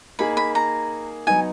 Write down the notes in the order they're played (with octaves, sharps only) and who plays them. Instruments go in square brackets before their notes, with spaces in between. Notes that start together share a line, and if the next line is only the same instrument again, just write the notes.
[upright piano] A#3 D#4 G#4 [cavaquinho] B5
[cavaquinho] B5
A#5
[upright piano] F#3 B3 D#4 [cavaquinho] G#5